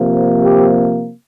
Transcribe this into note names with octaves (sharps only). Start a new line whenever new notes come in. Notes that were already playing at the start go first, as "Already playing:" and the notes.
Already playing: C3 F3 A#3
G4